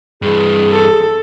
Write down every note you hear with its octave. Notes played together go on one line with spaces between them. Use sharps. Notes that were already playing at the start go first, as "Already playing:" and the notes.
G2 E3 G#4
A4